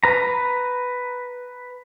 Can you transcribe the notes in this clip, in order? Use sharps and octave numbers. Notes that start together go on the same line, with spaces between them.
B4 A#5